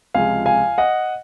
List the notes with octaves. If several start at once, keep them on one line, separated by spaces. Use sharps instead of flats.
C#2 C3 F3 G#3 F5 G#5
F5 G#5
D#5 F#5